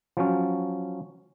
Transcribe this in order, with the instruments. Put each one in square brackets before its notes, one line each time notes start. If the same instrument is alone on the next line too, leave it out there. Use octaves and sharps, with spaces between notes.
[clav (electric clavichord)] F3 F#3 C#4